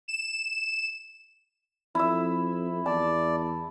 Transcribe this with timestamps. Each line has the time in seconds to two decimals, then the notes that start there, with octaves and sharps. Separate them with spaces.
0.08 E7
1.95 F2 E4 E5
2.86 E2 D5 A5